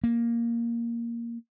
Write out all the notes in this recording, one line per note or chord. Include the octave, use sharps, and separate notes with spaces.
A#3